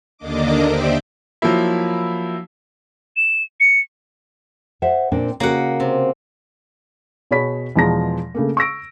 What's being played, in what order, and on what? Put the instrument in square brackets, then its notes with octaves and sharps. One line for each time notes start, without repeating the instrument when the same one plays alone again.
[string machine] D#2 D3 A#3 D4 D#5 D6
G4 C5 D5 E5 D6
[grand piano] F3 F#3 A#3 E4
[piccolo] E7
C#7
[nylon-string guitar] C5 E5 F#5
A#2 C4 D4
[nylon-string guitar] C#3 F#4 A#4 [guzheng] A#3 F#5
[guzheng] C3
[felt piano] B2 F#4 G#4 C#5 B5 B6
E2 B2 F3 G#3 A#5 A#6
C#3 A3 A#3
C#6 E6 A#6 D7